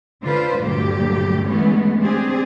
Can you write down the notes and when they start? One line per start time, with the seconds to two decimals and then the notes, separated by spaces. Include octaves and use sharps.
0.22 D3 D4 F4 B4 C5
0.60 D2 G2 A#2 D3 F#3 G4
1.47 D3 E3 G#3 A3 B3 C#4
2.00 C4 D4 G4 G#4